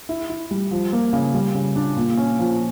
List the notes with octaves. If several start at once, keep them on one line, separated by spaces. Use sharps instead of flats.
E4
E4
G3
F3
A#3
C#3
G3
C#3
D4
A#2
C#4
F3